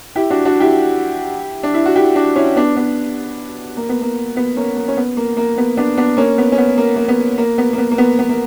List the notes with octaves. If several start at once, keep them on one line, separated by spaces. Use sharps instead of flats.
E4 G4
D4 F#4
D4 F#4
E4 G4
D4
E4
F#4
E4 G4
D4 F#4
C#4 E4
B3 D4
B3 D4
A#3
B3
A#3
B3
A#3 C#4
A#3
C#4
B3
A#3
A#3
B3
B3 D4
B3 D4
A#3 C#4
B3
C#4
B3
A#3
A#3
B3
A#3
B3
A#3
B3
A#3
B3
B3
A#3